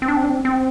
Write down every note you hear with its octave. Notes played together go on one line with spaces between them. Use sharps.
C4
D4
C4
D4
C4
C4